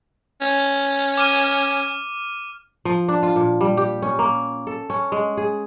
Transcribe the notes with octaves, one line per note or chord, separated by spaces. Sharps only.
C#4
D6 F6 D#7
F3
D4
F4
A#2
G3
G4
C#4
A#3
A4
C#4
G#3
G#4